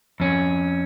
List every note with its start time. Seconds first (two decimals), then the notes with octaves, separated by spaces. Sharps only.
0.20 F2 C#4